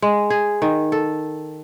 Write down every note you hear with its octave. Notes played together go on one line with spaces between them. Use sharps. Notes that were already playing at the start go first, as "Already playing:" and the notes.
G#3
G#4
D#3
A4